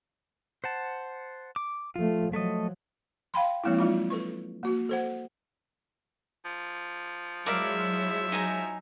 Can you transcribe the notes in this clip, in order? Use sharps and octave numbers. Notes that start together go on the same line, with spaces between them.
C5 F#5 A5
D6
F3 A3 F4
F3 F#3 A3 A4 D#5
F5 G5 B5 C6
F3 G#3 A#3 C4 E4
F#3 G#3 D#4 F4
A4 B4 C#6
A#3 F#4
A4 C5 F#5
F3
F#3 G#3 E4 A#4 D5 E5 F5
D#4 G#5 A#5